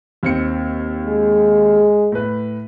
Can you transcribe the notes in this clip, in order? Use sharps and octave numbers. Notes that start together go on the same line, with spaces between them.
D#2 C4 C#7
G#3
A2 B4